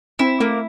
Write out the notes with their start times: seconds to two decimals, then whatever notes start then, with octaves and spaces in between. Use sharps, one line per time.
0.19 C4 E4
0.40 A3 A#3